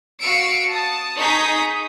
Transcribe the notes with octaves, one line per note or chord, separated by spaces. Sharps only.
F#4 F5 E6 C#7 D7
A5 D#6
D#4 G#4 C#6 D#6 G6 B6